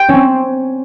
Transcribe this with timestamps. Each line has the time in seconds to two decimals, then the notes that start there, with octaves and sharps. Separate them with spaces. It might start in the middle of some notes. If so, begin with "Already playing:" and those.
Already playing: G5
0.09 C4 C#4